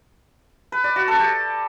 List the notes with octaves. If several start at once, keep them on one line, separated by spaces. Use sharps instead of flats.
B4
D5
F#4
A4
G4